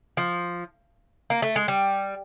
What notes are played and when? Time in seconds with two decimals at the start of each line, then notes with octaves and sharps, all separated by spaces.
0.17 F3
1.30 A#3
1.42 A3
1.56 G#3
1.68 G3